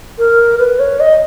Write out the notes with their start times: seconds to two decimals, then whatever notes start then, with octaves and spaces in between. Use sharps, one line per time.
0.18 A#4
0.59 B4
0.79 C#5
1.00 D#5